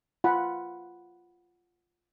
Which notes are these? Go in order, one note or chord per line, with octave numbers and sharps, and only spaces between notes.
F4 F#5 B5